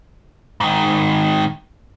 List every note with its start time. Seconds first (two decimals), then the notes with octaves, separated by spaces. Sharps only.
0.60 G#2 D#3